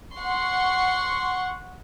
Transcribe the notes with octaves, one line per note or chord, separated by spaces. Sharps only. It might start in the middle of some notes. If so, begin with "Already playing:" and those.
F#5 C6 C#6